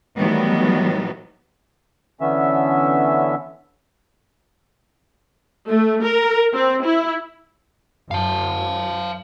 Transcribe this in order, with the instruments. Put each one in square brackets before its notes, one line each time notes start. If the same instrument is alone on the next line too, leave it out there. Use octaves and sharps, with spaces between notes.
[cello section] A2 D#3 E3 F#3 G3 B3
[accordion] D3 E3 B3 C#4 E5
[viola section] A3
A#4
C4
E4
[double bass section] F#2 [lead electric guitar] F5 A5